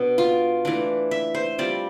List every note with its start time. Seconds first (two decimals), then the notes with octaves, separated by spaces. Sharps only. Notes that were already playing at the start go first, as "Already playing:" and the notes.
Already playing: B2 B3 D4
0.18 F4
0.65 E3 A3 D4
1.11 E5
1.35 C5
1.58 G3 C4 F4 D5